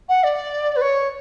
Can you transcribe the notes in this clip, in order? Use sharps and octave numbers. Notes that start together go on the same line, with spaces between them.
F#5
D5
B4
C#5